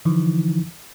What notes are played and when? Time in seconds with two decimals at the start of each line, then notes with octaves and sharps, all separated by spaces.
0.05 D3 E3 F3 D#4 E4